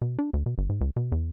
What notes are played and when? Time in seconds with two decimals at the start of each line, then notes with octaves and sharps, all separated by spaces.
0.02 B2
0.19 D4
0.33 D2
0.46 B2
0.58 G1
0.69 G#2
0.81 C#2
0.96 B2
1.12 E2